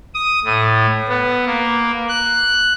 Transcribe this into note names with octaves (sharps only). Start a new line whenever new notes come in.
D#6
A2
B3
A#3
F#6